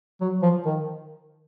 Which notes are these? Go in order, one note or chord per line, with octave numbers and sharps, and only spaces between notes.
F#3
F3
D#3